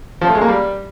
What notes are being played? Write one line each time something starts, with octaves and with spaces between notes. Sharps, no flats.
F3
A3
G#3
A#3
G3